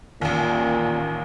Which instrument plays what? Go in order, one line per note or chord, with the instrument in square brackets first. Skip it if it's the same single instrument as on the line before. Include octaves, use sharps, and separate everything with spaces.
[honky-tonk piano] A1 D#2 [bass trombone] A#2